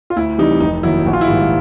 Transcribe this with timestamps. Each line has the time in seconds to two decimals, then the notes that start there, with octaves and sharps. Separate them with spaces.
0.10 F4
0.16 D2 E4
0.38 C3 E3 G3 D#4
0.61 F1 D#4
0.83 D#2 D#3 F#3 E4
1.06 A#1 F#4
1.13 F4
1.21 E4
1.28 G#2 D#3 G3 F4